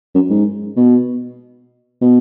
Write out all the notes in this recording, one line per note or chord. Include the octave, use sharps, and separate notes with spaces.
F#2
G#2
B2
B2